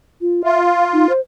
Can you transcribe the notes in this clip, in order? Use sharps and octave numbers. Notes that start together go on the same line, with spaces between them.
F4
F4 E5
F5
D#4
C5